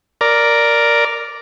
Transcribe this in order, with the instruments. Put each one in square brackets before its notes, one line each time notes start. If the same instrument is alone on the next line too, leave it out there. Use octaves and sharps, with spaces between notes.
[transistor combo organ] A#4 D5